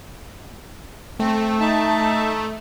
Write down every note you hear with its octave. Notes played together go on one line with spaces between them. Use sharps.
A3 C4
D#4 E5 A5